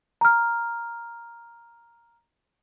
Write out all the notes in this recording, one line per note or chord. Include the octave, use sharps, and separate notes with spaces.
A#5 F6